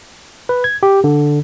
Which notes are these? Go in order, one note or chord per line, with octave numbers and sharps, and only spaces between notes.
B4
G#6
G4
D3